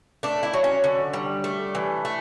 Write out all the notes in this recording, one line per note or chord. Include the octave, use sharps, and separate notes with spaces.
A3 D4
E4
F#3
C#4
D3
G3
A3
E3
A3